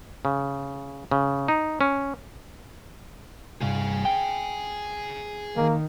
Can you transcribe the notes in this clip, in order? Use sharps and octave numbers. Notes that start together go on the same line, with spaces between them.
C#3
C#3
D#4
C#4
C2 G2 G#4 F5
G5
D#3 A#3